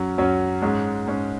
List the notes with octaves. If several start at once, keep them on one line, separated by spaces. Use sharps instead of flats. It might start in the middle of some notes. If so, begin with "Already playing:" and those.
Already playing: F#2 F#3 C#4
F#2 F#3 C#4
G#2 G#3 C#4
G#2 G#3 C#4